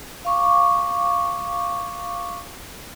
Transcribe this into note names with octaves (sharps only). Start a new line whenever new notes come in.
F5 C#6 D6